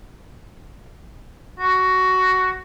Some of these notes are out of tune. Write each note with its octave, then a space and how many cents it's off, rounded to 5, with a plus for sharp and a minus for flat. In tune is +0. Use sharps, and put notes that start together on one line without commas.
F#4 +10